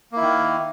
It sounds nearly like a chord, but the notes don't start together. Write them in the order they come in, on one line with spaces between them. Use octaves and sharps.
A#3 E4 D#3